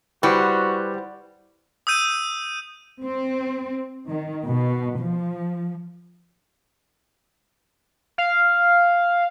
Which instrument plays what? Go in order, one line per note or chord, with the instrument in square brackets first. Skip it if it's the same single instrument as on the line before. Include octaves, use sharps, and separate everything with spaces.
[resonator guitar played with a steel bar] G3 [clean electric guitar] E4 C5 [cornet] F#4 [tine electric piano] B4 F#5 D6
[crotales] D#6 E6 G6 D#7
[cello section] C4
D#3
B2
F3
[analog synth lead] F5